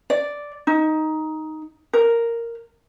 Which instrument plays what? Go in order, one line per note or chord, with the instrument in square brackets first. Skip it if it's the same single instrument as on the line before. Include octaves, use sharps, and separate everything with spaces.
[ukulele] D5
D#4
A#4